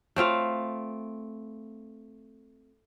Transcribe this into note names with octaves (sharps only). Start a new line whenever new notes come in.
A3 C4 F4 F5